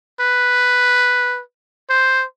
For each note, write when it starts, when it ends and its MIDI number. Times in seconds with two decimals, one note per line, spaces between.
0.21 1.41 71
1.90 2.25 72